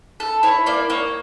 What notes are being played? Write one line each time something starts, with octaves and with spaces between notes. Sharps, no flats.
A4
E4 C#5
A#3 D5
A#3 C#5